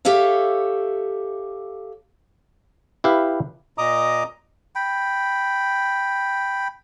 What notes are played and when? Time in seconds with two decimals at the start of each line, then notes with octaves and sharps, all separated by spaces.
0.05 G4 A4 C#5 E5 F5
3.04 E4 G4 B4 F5
3.78 A#2 D#5 A#5 D6 D#6
4.75 G5 B5